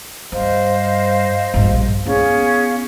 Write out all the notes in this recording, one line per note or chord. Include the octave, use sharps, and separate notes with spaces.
G2 C5 D#5 F5
A#1 G2
B3 C#4 E4 G#4 F5